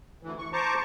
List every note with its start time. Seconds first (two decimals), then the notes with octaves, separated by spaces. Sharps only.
0.23 D2 E3
0.38 C#6
0.53 C5 A5 A#5 C#6 D6